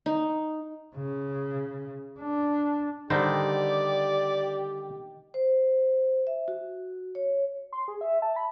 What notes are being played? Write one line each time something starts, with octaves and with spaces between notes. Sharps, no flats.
D#4
C#3
D4
D3 D#3 G3 D#4 G4 C5 D5
C5
E5
F#4
C#5
C6
G#4
E5
A5
B5